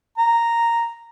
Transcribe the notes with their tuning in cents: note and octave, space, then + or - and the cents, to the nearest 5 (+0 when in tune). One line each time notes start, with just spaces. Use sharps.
A#5 -5